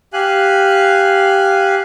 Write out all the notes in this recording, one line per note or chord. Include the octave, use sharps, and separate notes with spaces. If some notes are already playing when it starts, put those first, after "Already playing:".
G4 F5 G#5 F#6